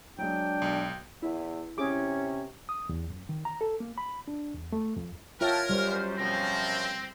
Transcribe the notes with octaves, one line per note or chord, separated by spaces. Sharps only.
F#3 G#3 D4 G5
B1
E2 E4
C3 C#4 G#4 D6
D#6
E2
F#2
D#3
A#5
A4
A#3
B5
D4
E2
A3
F2
F4 A#4 C#5 E5 F#5 G5 A5 F6
F#2 G3 B4 C5
F#2 B2 F3 C4 A#6